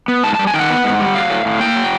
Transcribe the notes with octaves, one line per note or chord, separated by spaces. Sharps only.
B3
G#2 A5
G3 A5
G#5
D#3 G5
F#5
B3
G#2
G3
F#3 F5
A2
A2
A#3 G5
F#3